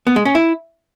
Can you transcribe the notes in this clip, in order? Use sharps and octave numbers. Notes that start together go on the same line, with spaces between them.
B3
G#3
C#4
E4